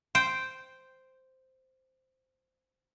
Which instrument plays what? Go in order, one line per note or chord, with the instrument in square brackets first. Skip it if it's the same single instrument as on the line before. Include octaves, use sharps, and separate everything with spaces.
[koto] C5 G5